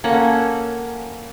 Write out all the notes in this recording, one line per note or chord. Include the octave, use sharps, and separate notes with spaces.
A#3 C#4 A4 F#5